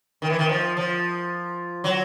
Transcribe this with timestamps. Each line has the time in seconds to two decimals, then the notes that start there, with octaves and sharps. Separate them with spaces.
0.22 D#3
0.30 E3
0.39 D#3
0.49 F3
0.77 F3
1.84 F#3